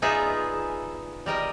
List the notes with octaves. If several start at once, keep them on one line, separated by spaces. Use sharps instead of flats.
B3 D#4 F4 G#4 D5 E5
G3 A#4 D#5 G5